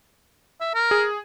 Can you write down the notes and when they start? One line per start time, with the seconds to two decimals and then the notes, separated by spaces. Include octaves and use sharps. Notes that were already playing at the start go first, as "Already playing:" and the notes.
0.60 E5
0.74 A#4
0.91 G#4